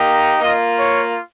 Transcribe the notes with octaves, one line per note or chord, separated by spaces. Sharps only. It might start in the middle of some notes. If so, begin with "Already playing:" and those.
Already playing: A#3 D#4 G4
A#3 F4 D#5
C#5